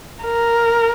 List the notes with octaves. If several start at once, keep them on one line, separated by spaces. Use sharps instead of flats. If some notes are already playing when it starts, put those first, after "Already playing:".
A#4